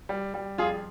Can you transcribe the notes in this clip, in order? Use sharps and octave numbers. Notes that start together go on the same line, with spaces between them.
G3
G3
F2 F4 G#4